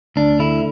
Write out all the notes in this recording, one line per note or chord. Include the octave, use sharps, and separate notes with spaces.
D2 D4
D3 E4